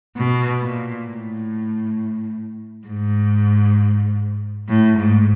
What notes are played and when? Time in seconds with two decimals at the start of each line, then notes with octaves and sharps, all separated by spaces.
0.17 B2
0.62 A#2
1.07 A2
2.88 G#2
4.68 A2
4.98 G#2